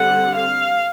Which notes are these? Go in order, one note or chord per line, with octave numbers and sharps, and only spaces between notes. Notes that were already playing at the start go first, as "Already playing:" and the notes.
Already playing: D3 G3 C4 F#5
F5